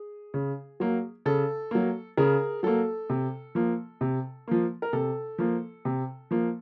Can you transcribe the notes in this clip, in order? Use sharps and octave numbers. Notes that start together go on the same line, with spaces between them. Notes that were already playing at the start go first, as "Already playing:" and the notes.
Already playing: G#4
C#3
F#3 A#3
C#3 A4
F#3 A#3
C#3 G#4 A#4
F#3 A#3 A4
C3
F3 A#3
C3
F3 A#3
A#4
C3 A4
F3 A#3
C3
F3 A#3